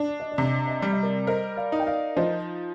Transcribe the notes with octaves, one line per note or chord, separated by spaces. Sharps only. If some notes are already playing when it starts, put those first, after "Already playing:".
Already playing: D4
D5
D#5
D5
C3
D#5
D5
D#5
G3 D5
D#5
A#4 D5
A#4 C5 D#5
D5 F5
D#4
G5
D5 F5
F3 C5 D#5